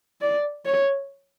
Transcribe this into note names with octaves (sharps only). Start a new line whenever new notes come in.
D5
C#5